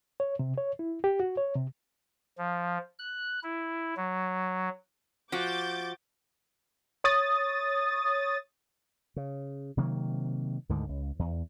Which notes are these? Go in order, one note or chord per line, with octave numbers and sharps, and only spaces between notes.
C#5
C3
C#5
E4
G4
F#4
C#5
C3
F3
F#6
E4
F#3
F3 F#4 D6 G6 A6
C#5 D#6 A6
C#3
C3 D#3 F#3 A#3
D2 G#2 D3 D#3
C#2
E2